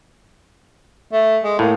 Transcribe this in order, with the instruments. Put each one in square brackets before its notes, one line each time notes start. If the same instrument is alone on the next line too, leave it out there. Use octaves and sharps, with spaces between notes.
[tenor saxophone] A3
G#3
[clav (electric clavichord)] A2 [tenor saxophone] A#3